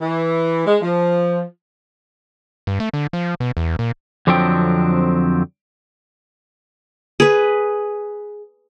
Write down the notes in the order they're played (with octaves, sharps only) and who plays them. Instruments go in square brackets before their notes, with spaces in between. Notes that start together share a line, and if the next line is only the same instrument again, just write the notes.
[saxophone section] E3
G#3
F3
[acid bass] G2
A3
D3
F3
B2
E2
A#2
[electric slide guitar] F2 D3 F3 F#3 C4 G5
[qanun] G#4 B4